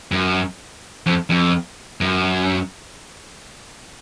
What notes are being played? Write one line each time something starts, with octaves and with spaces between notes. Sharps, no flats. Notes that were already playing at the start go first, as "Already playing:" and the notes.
F#2
F2
F2
F#2